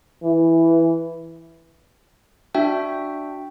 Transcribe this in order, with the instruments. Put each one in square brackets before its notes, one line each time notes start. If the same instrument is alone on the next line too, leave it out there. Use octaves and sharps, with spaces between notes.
[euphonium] E3
[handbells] D4 F#4 E5 G5